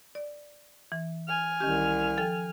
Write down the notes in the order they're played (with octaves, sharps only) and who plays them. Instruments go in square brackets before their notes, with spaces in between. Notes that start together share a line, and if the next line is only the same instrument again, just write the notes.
[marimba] D5
E3
[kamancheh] G#5 F6
[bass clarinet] C2 [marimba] D#3 C#4 G4
[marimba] F3 A4 G5